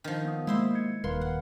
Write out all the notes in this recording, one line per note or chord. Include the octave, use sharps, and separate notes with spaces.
D#3 F3
B3 D#6
G#3 A#3 E4 C5 D#5 E5
G#6 C#7
D#1 A#4 B4 F5 C6
F#5